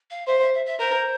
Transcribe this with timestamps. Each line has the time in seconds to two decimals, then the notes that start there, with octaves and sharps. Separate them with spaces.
0.11 F5
0.27 C5 E5
0.40 E5
0.54 E5
0.66 E5
0.79 A#4 C5